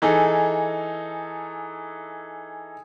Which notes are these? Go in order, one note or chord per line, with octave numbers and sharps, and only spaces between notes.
E3 D#4 G#4 A4